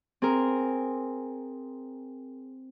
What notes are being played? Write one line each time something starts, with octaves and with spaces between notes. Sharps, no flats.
C4 G#4 A#4